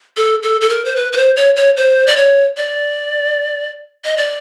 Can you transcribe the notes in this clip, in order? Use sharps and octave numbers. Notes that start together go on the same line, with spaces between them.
A4
A4
A4
A#4
C5
B4
B4
C5
C#5
C#5
C5
D5
C#5
D5
D#5
D5